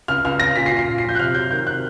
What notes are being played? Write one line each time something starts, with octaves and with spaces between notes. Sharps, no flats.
C#2 F6
C#2 F6
C#3 A#6
A#2 B6
C7
A#2
C7
A#2
C7
F3 G6
F#6
C3 F6
F#3 G6
D#3 G6
C3 F#6